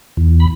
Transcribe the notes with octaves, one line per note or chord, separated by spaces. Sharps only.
E2
B5